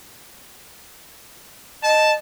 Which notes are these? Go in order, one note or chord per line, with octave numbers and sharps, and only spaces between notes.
D#5 A5